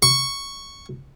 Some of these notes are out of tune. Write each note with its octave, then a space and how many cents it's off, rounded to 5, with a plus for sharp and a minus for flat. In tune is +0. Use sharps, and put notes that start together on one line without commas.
C#6 +0